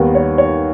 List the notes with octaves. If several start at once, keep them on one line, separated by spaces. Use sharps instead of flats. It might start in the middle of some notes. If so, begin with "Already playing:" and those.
Already playing: D#2 D#3 G3 B3
C#5
C#5